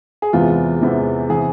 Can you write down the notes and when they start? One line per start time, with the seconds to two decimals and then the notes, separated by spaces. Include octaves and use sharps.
0.22 G#4
0.33 E2 C3 E3 G#3 B3 F4
0.82 E2 C3 E3 G#3 B3
1.29 C3 E3 B3 G#4